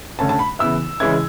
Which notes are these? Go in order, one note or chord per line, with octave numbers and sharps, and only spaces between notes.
D3 A3 C#4 A5
A5
B5
C#3 E3 B3 E4 E6
C#3 E3 G#3 C#4 E4 G#6